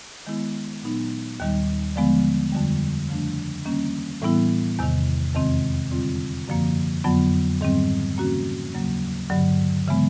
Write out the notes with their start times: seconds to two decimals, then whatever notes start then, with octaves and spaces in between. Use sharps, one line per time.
0.27 D#3 G#3 B3 E4
0.83 A#2 F#3 B3 D#4
1.40 D#2 D#3 G3
1.96 D3 F3 G#3 B3
2.52 F2 D3 G3
3.09 C#3 F3 A3 D4
3.66 D#3 G3 A#3 C#4
4.22 A2 E3 G3 B3 E4
4.79 E2 C3 D#3
5.35 F2 C3 D#3 G#3 C4
5.91 D3 G3 C4 F4
6.48 F#2 D3 F3 A#3
7.04 F2 D3 F#3 B3
7.61 G#2 D#3 G3 C4
8.17 C#3 F3 A#3 C#4 F#4
8.74 D#2 C#3 F#3 A#3
9.30 G2 D3 F#3
9.88 C#3 E3 G#3 B3